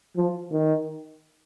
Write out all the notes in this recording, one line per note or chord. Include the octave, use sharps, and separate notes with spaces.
F3
D#3